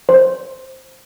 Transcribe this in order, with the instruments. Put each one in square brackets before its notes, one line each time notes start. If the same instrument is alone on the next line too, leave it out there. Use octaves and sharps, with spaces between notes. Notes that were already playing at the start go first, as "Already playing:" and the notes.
[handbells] C5